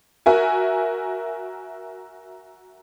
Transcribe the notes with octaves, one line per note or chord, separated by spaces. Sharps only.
F#4 A#4 E5 G#5